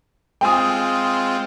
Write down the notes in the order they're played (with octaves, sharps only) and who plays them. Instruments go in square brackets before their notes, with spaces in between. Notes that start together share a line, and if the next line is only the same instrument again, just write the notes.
[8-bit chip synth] G#3 C4 F4 [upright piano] G5 G#5 D#6